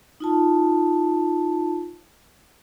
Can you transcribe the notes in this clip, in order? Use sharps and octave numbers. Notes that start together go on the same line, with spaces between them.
D#4 F4 A5